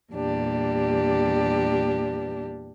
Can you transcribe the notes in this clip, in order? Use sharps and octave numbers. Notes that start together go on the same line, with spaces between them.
E2 A#2 G3 D4 G4